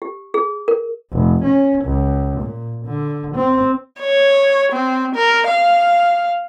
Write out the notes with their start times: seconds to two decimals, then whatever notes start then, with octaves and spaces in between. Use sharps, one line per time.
0.02 G4
0.34 G#4
0.68 A#4
1.12 F1
1.44 C#4
1.84 C#2
2.41 A#2
2.85 D3
3.35 C4
4.00 C#5
4.72 C4
5.15 A#4
5.48 F5